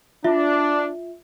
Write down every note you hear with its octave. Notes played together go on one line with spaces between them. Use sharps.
D4 F4 E5